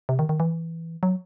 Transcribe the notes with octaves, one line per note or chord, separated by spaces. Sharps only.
C3
D#3
D#3
E3
F#3